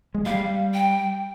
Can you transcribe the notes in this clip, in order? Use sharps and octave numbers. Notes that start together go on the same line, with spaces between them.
G#3
G3 F5
G5